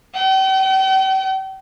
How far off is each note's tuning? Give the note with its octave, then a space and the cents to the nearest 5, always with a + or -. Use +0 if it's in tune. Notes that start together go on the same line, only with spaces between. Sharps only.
G5 -40